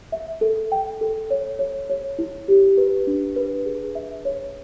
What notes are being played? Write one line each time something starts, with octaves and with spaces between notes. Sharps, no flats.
E5
A4
G5
A4
C#5
C#5
C#5
E4
G4
B4
D4
B4
G#4
E5
C#5